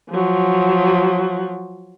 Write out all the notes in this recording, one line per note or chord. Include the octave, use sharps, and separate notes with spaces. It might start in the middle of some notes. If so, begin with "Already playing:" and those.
F3 F#3